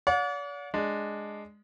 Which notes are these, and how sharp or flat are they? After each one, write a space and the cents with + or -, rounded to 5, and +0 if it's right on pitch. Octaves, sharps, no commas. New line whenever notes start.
D5 -45 F#5 -45
G#3 +0 D4 +5